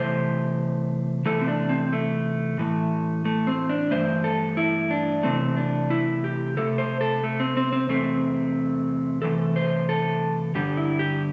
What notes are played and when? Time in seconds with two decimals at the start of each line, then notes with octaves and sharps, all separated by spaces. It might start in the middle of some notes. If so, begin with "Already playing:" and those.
Already playing: C3 E3 A3 C5
1.25 C3 E3 A3 A4
1.41 C4
1.47 D4
1.69 C4
1.93 A3
2.58 A2 E3 A3
3.25 A3
3.47 C4
3.69 D4
3.91 G2 E3 A3 C5
4.24 A4
4.57 E4
4.91 D4
5.23 C3 E3 A3 C4
5.56 D4
5.90 E4
6.24 G4
6.57 C3 A3 A4
6.78 C5
7.01 A4
7.23 A3
7.40 C4
7.57 C4
7.73 C4
7.89 E2 C3 A3 C4
9.22 C3 E3 A3 A4
9.56 C5
9.89 A4
10.55 G2 D3 G3 G4
10.77 E4
10.99 G4